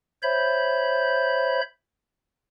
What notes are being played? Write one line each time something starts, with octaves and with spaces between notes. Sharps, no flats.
C5 C#5 E5 B5 G6